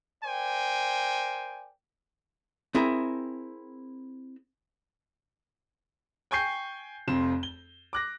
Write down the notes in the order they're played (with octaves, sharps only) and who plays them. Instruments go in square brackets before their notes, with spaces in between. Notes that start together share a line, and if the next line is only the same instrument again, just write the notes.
[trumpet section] A#4 C5 D5 G5 G#5
[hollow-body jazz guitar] C4 E4 G#4 A#4 A#5
[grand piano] G5 G#5 C#6 G6 C7
F1 F2 C4 E7
G7
D6 F#6 A#6